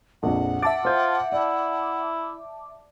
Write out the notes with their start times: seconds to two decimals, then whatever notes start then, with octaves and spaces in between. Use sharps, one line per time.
0.23 A#1 F2 F#5
0.62 E5 A5 D6 A6
0.85 F4 C5 G6
1.32 E4 D5